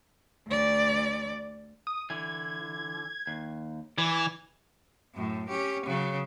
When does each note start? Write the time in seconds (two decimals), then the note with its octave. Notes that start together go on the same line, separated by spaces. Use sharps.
0.47 D2 D5
1.87 D#6
2.10 D3 E3 G#6
3.27 D#2
3.98 E3 D5 G#6
5.14 F#2 A2
5.50 C#4 G4
5.86 C#3 F#3